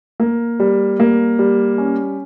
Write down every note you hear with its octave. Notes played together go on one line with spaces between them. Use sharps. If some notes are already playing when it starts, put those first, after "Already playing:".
A#3
G3
A#3
G3
C#4